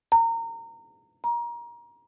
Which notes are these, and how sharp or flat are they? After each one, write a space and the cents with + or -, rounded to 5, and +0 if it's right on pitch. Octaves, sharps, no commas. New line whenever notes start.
A#5 -25
A#5 +25